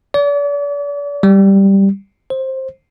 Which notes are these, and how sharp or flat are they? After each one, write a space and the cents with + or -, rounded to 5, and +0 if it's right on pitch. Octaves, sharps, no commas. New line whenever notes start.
D5 -40
G3 +0
C5 +15